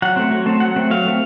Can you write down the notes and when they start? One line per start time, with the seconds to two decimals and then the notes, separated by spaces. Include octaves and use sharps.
0.02 F#3 F#5
0.16 A3 C4
0.31 F#3
0.46 A3 C4
0.60 F#3 F#5
0.76 A3 C4
0.90 F#3 F5
1.05 A3 C4